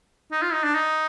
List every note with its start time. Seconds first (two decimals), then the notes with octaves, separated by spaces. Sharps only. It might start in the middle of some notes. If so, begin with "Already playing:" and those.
0.32 D#4
0.42 F4
0.53 D#4
0.64 D4
0.75 D#4